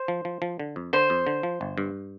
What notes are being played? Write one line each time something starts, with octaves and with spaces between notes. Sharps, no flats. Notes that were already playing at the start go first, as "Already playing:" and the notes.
Already playing: C5
F3
F3
F3
D3
F2
D3 C5
F2
D3
F3
G1
G2